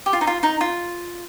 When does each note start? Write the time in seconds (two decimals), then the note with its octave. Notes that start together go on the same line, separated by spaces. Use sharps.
0.06 G4
0.13 F4
0.21 D#4
0.27 F4
0.43 D#4
0.61 F4